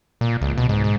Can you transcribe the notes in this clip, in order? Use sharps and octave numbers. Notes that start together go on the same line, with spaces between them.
A#2
C#2
B2
G#2
G#2